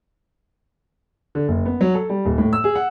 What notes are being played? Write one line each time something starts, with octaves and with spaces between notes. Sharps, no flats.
D3
F#1
B3
F#3
A4
G3
D#1
A2
E6
G#4
F#5